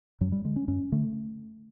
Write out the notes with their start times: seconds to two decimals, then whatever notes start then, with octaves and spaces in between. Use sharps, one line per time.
0.21 F#2 F#3
0.32 G3
0.44 D3 G#3
0.56 C#4
0.68 F#2 C#4
0.92 D3 A3